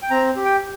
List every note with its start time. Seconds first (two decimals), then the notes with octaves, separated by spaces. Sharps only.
0.02 G5
0.11 C4 A#5
0.36 G4
0.45 G5